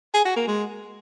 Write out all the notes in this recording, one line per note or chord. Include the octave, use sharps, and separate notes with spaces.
G#4
F#4
A#3
G#3